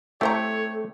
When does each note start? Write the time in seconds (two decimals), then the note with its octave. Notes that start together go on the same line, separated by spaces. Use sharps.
0.21 A3 C4 E4 G4 A4 C5 C#5 A#5